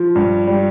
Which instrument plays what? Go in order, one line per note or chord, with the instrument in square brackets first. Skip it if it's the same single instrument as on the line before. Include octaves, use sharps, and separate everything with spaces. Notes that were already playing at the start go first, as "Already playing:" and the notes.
Already playing: [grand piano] F3
G2
G3